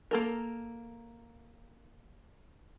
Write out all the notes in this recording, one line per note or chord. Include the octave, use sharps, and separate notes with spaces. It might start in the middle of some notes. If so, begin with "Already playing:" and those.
A#3 A4 A#4